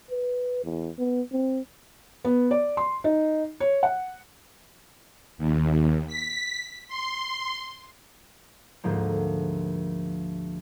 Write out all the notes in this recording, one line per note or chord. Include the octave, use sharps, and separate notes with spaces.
B4
E2
B3
C4
B3
D5
C6
D#4
C#5
F#5
D#2
B6
C6
D2 G#2 F3 A#3